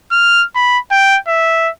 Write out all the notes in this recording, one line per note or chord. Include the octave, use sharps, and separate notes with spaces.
F6
B5
G5
E5